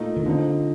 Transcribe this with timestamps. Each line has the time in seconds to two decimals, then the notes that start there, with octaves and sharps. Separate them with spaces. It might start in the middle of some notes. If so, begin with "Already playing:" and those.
Already playing: A#2 A3 D#4
0.16 D#3
0.26 D3 F3 C4 D#4